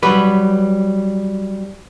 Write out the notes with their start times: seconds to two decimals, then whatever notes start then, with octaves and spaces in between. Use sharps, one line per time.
0.03 F#3 G3 B4